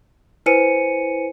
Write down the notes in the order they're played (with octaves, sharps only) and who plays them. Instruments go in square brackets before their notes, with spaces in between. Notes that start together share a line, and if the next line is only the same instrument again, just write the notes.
[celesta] E4 B4 C5 G#5 C#7 D#7